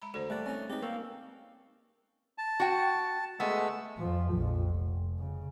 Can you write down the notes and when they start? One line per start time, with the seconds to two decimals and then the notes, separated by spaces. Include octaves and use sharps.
0.02 G#3 A#5 B5
0.14 D2 A4 C5 D5
0.30 G3 A3 A#3 F#6 A6
0.46 C4 C#4 D#4
0.70 G#3 C4 D#4 G4 B4
0.82 A#3 G5 C#6 E6
2.38 A5
2.60 F#4 G5
3.40 G#3 A3 B3 G#5 E6
3.98 F2 F3
4.33 A#1 F2
4.72 F1
5.18 C#3